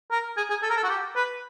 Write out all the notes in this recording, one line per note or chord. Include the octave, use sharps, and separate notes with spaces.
A#4
G#4
G#4
A4
A#4
A4
F#4
G4
B4